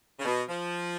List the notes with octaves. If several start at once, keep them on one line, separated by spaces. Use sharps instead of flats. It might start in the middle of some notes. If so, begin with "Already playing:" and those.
C#3
B2
F3